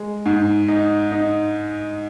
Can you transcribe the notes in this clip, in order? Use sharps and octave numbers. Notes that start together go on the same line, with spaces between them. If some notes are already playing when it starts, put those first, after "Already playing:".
Already playing: G#3
G#2
D#4
D#4